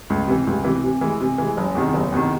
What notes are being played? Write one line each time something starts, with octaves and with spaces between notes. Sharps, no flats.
C#2
C3 E3
C#2
C3 E3
C3
E3 G#3
C3
E3 G#3
F#1
E2 C3 D#3
F#1
E2 C3 D#3